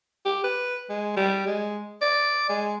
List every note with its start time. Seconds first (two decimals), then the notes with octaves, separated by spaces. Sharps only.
0.25 G4
0.44 B4
0.90 G#3
1.16 G3
1.46 G#3
2.01 D5
2.49 G#3